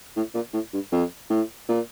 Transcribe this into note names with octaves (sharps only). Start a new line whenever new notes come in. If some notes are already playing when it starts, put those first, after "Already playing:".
A2
A#2
A2
G2
F2
A2
A#2